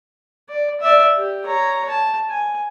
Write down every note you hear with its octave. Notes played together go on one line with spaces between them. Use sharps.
D5
D5 E5
G4
C#5 A#5
A5
G#5